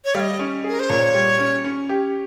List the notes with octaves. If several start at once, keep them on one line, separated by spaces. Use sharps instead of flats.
C#5
G3 F5
D#5
C#4
G#4 A#4
C5
A#2 C#5
G3
C#4
C#4
G4